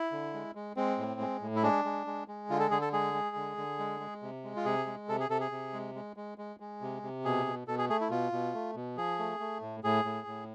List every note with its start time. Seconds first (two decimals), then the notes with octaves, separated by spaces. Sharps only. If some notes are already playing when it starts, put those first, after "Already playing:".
Already playing: E4
0.12 D3
0.34 G#3
0.55 G#3
0.77 G#3 C4
0.98 A2
1.20 G#3
1.41 A2
1.56 E4
1.63 G#3 D4
1.85 G#3
2.07 G#3
2.28 G#3
2.50 D3 F4
2.60 A4
2.71 D3 G#4
2.81 A4
2.93 G#3 G#4
3.14 G#3
3.36 D3
3.57 D3
3.79 G#3
4.00 G#3
4.23 C3
4.44 G#3
4.56 F4
4.65 C3 G#4
4.86 G#3
5.09 C3 A4
5.20 G#4
5.30 C3 A4
5.40 G#4
5.52 C3
5.73 G#3
5.95 G#3
6.17 G#3
6.38 G#3
6.60 G#3
6.81 C3
7.03 C3
7.25 B2 G#4
7.46 B2
7.68 B2 A4
7.78 G#4
7.89 A3 G#4
8.01 E4
8.10 B2 F4
8.32 B2
8.54 A3
8.76 B2
8.97 F3 G#4
9.19 A3
9.40 A3
9.62 A2
9.84 A2 G#4
10.05 A2
10.27 A2